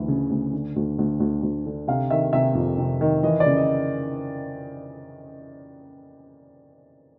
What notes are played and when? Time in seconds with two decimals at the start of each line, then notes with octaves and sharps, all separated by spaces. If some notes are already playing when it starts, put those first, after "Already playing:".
Already playing: D2 E3
0.08 C#3
0.31 D2
0.53 D3
0.76 D2
0.99 D2
1.20 D2
1.43 D2
1.66 D3
1.88 C3 F5
2.10 D#3 E5
2.33 C3 E5
2.55 F2
2.79 C3
3.01 D#3
3.23 E3 D#5
3.40 D5
3.46 C#3
3.56 D#5